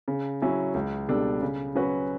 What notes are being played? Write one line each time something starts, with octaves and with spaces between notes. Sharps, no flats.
C#3
F#3 C#4 E4
C#2
B2 G3 D4 A4
C#3
F#3 C#4 F#4 B4